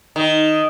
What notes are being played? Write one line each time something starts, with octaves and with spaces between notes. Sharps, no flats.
D#3